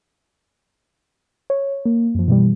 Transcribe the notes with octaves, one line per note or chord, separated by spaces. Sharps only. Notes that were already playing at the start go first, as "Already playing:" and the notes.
C#5
A#3
F#2 F3
B2 E3 G3